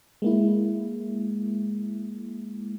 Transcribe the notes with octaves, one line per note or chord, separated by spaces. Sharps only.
G#3 A#3 E4